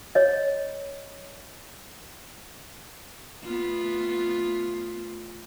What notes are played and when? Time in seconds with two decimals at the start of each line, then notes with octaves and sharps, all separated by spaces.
0.15 C#5 D#5
3.44 A3 B3 F4